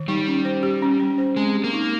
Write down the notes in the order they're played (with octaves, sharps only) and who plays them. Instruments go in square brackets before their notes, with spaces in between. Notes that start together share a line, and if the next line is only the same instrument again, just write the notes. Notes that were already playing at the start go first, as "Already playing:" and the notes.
Already playing: [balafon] D#3
[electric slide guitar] G3 [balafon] D#4
[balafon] C#4
C5
G4
C#4
C#4
C5
[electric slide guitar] G#3 [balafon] C4
[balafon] G4
[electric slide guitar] A#3
[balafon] D#4